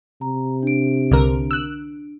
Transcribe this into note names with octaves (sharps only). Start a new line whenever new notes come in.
C3 A#5
D4 D7
C2 D3 A#4
E6 F#6